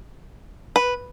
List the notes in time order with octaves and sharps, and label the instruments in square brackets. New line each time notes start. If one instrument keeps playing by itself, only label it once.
[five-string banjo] B4